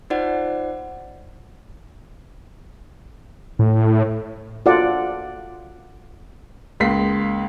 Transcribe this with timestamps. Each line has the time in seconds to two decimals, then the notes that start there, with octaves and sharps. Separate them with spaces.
0.10 D#4 F4 C5 D5 F#5
3.59 A2
4.66 F4 F#4 A4 D5 F#5
6.80 C#2 G#3 A#3 B6 C7